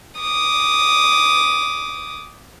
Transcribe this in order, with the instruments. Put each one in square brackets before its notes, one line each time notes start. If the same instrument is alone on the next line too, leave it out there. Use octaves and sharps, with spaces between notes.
[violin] D6 D#6